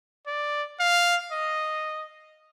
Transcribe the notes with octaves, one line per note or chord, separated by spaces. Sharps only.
D5
F5
D#5